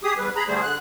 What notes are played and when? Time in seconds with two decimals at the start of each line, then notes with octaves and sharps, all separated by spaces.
0.04 G4 G#4 D#6
0.18 E2 G3 B4
0.36 G#4 A#5 B5
0.47 D3 G3 A3 G#4 C5
0.62 D3 F#6